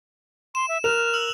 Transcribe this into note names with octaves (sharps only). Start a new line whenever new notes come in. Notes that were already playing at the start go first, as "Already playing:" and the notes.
C6 E7
E5
A#4 F6 F#6 E7 F7
E6 F#7